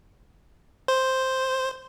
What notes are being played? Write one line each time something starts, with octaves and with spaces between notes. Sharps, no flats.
C5